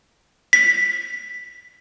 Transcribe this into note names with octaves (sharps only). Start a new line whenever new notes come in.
B6